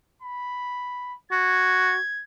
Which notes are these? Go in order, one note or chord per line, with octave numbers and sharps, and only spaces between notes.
B5
F#4 G#6